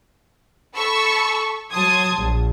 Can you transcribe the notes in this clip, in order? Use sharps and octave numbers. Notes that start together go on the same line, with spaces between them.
A4 A5 B5 C#6 E6
F#3 A5 C6 D#6 G#6
A#1